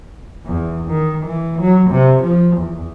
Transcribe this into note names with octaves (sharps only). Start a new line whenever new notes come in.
E2
D#3
E3
F#3
C3
F3
E2